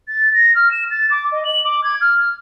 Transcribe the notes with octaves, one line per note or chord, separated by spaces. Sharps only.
A6
A#6
F6
E7
A6
D6
D#5
F#7
D6
G#6
F6